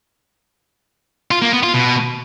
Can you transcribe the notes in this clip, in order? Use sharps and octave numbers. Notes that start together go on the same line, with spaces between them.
F4
A#3
B3
F4
B2